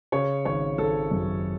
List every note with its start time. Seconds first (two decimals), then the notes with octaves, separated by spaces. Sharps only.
0.12 C#3 C#5
0.45 G#1 C#5
0.78 G#1 A4
1.11 F#2